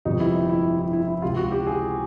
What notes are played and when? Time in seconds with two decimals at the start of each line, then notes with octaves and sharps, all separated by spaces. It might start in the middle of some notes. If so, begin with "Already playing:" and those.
0.05 G1 F2 C3 F3 G#3 D#4
0.20 E4
0.49 E4
0.79 E4
0.93 E4
1.08 E4
1.22 C#2 C3 E3 F4
1.37 F#4
1.52 G4
1.67 G#4